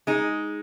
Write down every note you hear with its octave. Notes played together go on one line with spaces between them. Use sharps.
G#3 D#4